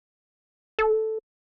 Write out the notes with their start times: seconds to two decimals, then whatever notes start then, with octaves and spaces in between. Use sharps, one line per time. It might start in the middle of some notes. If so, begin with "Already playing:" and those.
0.79 A4